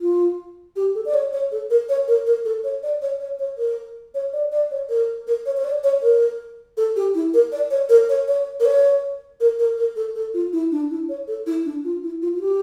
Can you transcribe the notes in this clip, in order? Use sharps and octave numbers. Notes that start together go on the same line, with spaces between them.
F4
G4
A4
D5
C#5
C#5
A4
A#4
C#5
A#4
A#4
A4
C#5
D5
C#5
C#5
C#5
A#4
C#5
D5
D5
C#5
A#4
A#4
C#5
C#5
D5
C#5
A#4
A4
G4
E4
A#4
D5
C#5
A#4
C#5
C#5
A#4
C#5
A#4
A#4
A#4
A4
A4
F4
E4
D4
E4
C#5
A4
E4
D4
F4
E4
F4
F4
G4